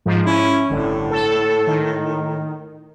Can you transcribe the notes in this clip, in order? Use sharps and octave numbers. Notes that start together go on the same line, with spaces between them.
G#2 F3
C#4 E4
G1 A2 D3
A4
D#3